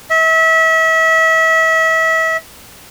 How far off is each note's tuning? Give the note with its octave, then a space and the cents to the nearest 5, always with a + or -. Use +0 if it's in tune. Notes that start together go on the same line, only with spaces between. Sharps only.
E5 -30